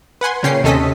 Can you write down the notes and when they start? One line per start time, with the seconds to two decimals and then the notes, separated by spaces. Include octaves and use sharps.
0.21 B4 F#5 G#5 C6
0.43 A#2 C#3 C#4 G5 C7
0.63 D#2 C3 C#4 A4 D#5 B6